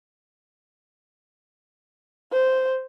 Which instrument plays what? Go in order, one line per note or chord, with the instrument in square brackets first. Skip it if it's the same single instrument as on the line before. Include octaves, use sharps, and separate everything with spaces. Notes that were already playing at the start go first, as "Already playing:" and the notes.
[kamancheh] C5